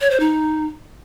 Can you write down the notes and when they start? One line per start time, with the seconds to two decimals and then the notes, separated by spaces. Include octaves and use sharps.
0.01 C#5
0.10 C5
0.20 D#4